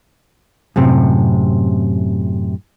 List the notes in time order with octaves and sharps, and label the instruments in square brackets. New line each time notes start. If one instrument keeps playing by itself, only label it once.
[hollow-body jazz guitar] F#2 A2 C3